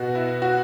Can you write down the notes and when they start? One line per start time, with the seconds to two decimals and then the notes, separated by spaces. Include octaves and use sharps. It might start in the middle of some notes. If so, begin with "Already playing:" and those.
Already playing: B2 B3 F#4
0.15 E4
0.42 F#4